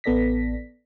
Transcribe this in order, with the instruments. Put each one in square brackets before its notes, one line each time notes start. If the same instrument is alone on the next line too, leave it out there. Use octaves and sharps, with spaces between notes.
[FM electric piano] A1 B3 A4 D5 A#6 B6